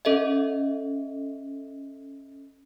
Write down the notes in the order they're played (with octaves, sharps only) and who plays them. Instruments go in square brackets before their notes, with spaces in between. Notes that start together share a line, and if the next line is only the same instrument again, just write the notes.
[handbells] C#4 A4 D#5 E5